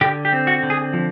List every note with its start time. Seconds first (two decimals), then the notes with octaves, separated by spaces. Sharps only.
0.01 D3 G4
0.25 G4
0.33 C4
0.47 F#4
0.63 D3
0.70 G#4
0.93 F3